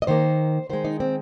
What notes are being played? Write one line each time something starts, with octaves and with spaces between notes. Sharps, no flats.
D#5
D#3 A#3 C5
D#3 G#3 C5
D#4
C4